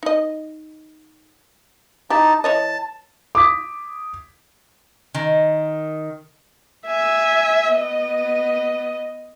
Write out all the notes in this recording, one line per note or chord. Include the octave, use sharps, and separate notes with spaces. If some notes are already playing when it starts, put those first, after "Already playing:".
D#4 D#5
D#4 E4 G4 A5
E3 C#5 D#5 A5
D6 D#6 B6
D#3
E5 G#5
B3 D#5